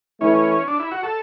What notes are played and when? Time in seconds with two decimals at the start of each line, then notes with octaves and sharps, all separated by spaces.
0.20 E3 A3 C#4 E4
0.68 D4
0.79 E4
0.91 F#4
1.03 A4